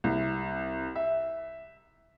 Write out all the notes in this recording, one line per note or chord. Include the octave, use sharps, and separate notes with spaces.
C2
E5